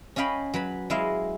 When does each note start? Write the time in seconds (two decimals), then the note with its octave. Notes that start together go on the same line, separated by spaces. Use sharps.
0.16 C#4 D#5 F5 G5 B5
0.54 F#3 B4 B5
0.90 F#3 G#3 E4 D#5 F5